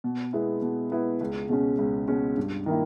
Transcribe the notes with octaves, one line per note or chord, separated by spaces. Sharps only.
B2
G#3 B3 E4
B2
G#3 B3 E4
C#2
B2 G#3 C#4
C#2
B2 G#3 C#4
G2
D#3 A#3 E4